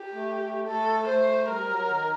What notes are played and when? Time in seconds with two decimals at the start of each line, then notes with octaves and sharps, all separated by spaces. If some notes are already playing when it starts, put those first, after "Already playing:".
Already playing: G4
0.13 A3
0.41 A3
0.67 A3 A4
1.08 A3 C5
1.49 G3 A#4
1.69 F#3
1.89 D#3